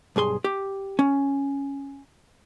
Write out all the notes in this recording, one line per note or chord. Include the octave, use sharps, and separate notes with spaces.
B1 G2 G#4 C6
G4
C#4